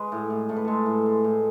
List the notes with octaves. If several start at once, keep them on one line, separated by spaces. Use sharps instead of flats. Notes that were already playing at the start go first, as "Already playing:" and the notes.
Already playing: G#3 B4
A2
A2
A2 A4
B4
G#3 A4
A2
G#3
A2